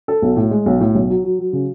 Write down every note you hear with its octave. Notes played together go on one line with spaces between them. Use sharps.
A4
B1
A2
G#3
B1
A2
B1
F#3
F#3
F#3
C#3